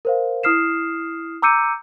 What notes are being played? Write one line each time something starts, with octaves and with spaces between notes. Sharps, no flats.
A#4 C5 F5
E4 D#6 F6 C7 E7
A#5 D6 E6 G6 C#7 D#7